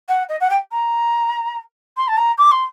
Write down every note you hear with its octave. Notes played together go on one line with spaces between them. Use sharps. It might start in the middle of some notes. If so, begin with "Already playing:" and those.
F#5
D#5
F#5
G5
A#5
C6
A5
A#5
D6
C6